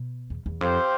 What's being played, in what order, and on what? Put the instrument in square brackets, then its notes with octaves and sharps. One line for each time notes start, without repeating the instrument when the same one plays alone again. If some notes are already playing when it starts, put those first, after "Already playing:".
Already playing: [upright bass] B2
E2
E2
[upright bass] F2 [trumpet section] C4 G4 C5 F5